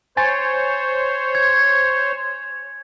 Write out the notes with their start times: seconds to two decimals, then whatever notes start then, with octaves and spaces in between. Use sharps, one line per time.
0.17 C5 C#5 G#5 A6
1.35 G#6